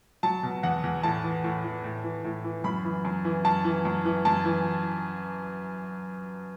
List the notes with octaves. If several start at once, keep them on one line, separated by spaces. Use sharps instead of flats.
F#3 A5
B2
E2 F#5
E2
A2 A5
E3
A2
E3
A2
E3
A2
E3
F#2 B5
E3
F#2
E3
F#2 A5
E3
F#2
E3
F#2 A5
E3